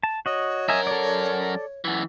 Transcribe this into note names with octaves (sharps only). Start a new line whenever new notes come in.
A5
F#4 C#5 D#5
F#2 A#4 D#5 E5 G#5
A4 D5
F#2 E3